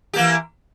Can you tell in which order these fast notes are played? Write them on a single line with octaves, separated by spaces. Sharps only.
G4 A#3 E3